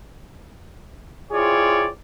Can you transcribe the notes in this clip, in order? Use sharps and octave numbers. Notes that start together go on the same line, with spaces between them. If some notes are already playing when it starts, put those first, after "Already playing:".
C4 E4 F4 G#4 C#5 D5